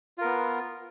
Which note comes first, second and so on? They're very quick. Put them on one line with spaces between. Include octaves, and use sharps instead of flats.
F4 A#4 B3